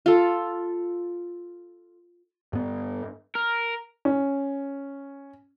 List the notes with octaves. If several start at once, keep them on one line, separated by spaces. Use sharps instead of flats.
F4 A4
G2 B3
A#4
C#4